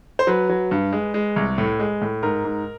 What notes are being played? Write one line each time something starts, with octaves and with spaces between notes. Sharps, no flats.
C5
F#3 B4
F#3
G2
G#3
G#3
C2
A2
G#3
A2
G#2 A#4
G#2